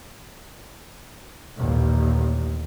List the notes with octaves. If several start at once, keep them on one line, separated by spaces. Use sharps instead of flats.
A1 D#2 A#2